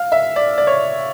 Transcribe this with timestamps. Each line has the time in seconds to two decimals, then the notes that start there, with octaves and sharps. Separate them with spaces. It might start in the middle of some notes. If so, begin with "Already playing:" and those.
Already playing: F5
0.12 E5
0.36 D5
0.58 D5
0.67 C#5